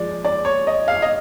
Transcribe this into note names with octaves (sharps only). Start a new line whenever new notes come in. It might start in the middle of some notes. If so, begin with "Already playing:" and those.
Already playing: F3 G#3 D5
D5
C#5
D#5
F5
D#5